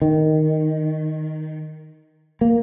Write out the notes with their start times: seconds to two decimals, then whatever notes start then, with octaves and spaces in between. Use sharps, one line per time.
0.02 D#3
2.41 A#3